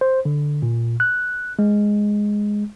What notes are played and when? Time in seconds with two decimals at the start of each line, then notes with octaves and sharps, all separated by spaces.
0.01 C5
0.25 D3
0.62 A#2
1.00 F#6
1.59 G#3